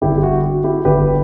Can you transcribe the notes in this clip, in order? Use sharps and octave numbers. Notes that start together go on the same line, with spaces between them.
G1 G2 D3 E4 G4
G4
F#4
F#4
E4 G4
G1 G2 D3 G4 B4